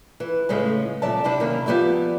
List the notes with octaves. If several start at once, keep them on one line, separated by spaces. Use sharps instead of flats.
E3
A2 C#3 G#3 A3 C#4
A#2 C#3 F#3 D5 E5 A5
C3 D4 E4 G4
D#3 F#3 A#3 C#4 E4
F3 B3 G4 D5 E5